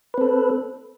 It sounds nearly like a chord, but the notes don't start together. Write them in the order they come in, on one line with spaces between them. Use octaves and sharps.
B4 C4 A4